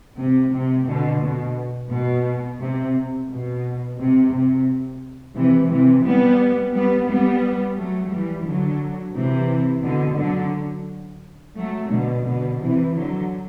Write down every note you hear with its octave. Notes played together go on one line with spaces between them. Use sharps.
C3
C3
B2 D3
B2
B2
C3
B2
C3
C3
C3 E3
C3 E3
G3 B3
G3 B3
G3 B3
F#3 A3
E3 G3
D3 F#3
C3 E3
B2 D3
D3 F#3
F#3 A3
B2 D3
B2 D3
C3 E3
D3 F#3